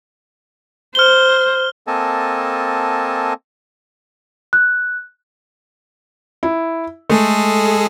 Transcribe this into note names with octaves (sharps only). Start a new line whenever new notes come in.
C5 F6 G7
A#3 C4 A4 D#5 G#5 A5
F#6
E4
G#3 A3 G#4 A4